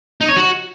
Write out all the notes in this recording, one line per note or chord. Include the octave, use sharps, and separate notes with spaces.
D#4
C#5
F#4